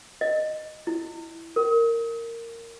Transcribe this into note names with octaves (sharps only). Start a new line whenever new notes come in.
D#5
E4
A#4